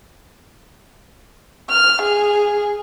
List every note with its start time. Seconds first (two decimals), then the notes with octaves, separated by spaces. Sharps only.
1.70 F6
2.02 G#4